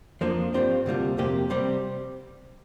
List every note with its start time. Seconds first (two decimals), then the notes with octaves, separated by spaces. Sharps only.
0.21 F2 F3 A#3 D4 F4
0.54 G2 G3 C4 F4
0.86 D2 C3 G3 A#3 F4
1.18 F2 C3 A#3 G4
1.50 C3 G3 C4